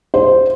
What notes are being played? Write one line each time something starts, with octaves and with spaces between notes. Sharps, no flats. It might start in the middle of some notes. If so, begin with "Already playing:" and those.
C5